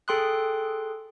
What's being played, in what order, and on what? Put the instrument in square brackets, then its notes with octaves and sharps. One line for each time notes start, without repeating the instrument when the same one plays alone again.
[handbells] G#4 A4 G5 C6 D#6 F#6